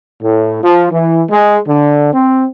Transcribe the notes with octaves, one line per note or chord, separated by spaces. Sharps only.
A2
F3
E3
G#3
D3
C4